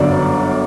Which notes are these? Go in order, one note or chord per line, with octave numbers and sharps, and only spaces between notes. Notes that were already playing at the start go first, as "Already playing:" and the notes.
Already playing: G1 F#2 D3 D5